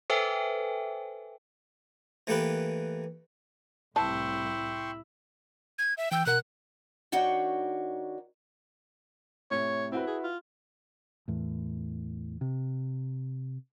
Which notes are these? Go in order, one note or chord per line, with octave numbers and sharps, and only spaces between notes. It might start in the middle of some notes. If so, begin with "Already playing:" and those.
A4 B4 C5 E5 G5 G#5
E3 A3 A#3 G4 B4
C2 A2 E4 B4 G5 A5 C6 C#6
G#6
E5
E3 G5 E6 G6
B2 A#4 F#5 F#6
D#3 D4 F#4 C#5 G5
A2 C3 C#5
C4 E4 F#4 B4
G#4
F4
E2 A2
C3